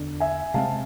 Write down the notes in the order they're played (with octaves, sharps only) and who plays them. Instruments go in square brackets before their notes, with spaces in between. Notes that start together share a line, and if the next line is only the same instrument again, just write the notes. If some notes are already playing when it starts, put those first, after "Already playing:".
Already playing: [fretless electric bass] E2 D3 D4
[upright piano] E5 G#5
[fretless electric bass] C3 G#3 C4 [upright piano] F5 A5